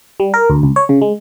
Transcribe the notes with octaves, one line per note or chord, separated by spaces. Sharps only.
G3
A#4
D2
C#2
C#5
C#3
G#3